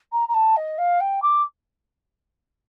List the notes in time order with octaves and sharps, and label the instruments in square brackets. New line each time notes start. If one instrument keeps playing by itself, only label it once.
[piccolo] A#5
A#5
A5
D#5
F5
G5
D6